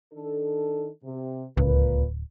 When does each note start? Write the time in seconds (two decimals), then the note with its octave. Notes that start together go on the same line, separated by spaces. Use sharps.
0.13 D#3 D4 A4
1.04 C3
1.57 D1 C#2 A#2 A#3 B4